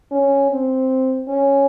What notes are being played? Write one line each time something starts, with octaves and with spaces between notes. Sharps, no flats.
C#4
C4
C#4